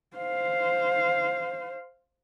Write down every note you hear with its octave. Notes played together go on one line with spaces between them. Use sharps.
C5 F5